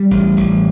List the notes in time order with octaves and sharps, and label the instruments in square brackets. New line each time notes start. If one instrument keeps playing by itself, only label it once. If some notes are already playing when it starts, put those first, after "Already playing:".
Already playing: [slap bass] G3
A1
A1